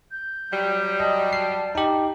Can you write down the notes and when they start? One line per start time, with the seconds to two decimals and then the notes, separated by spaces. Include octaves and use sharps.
0.11 G6
0.51 F#3 G3
1.00 D#5 A5
1.33 C7
1.75 D#4 G4